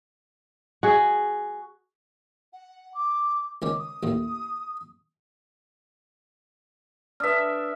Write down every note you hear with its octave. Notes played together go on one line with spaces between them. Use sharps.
F#4 G#4
F#5
D6
C#2 D#3 C#4 D6
D#6
A1 D#2 A2
D4 B4 E5 D#6 F6